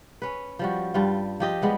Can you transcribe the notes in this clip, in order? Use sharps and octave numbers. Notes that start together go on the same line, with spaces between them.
C#4 B4
F3 G3 F#4
G2 G3 F4
F3 G4 D#5
G3 G#3 B3